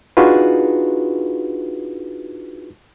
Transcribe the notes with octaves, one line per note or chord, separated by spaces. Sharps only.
D4 D#4 F4 F#4 G#4 B4